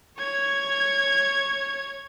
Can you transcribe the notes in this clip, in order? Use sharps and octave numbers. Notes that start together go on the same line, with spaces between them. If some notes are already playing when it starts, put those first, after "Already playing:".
C#5 G#6